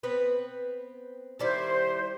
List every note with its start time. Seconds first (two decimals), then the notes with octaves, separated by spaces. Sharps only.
0.03 B3 C4 B4
1.39 D#3 G3 E4 C5